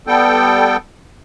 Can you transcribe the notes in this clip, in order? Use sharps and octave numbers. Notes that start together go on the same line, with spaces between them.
G3 B3 A4 G5